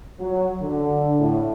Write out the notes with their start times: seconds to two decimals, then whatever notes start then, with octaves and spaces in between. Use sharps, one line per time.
0.19 F#3
0.61 D3
1.19 A2